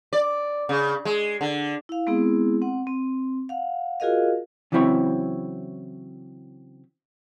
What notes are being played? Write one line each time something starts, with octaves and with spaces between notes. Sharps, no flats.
D5
C#3
G#3
D3
E4 F5
G#3 B3 C4 E4 G#4
C4 F#5
C4
F5 F#5
F4 F#4 G#4 A#4 D#5 F5
C#3 E3 F#3 C4 E4 C#5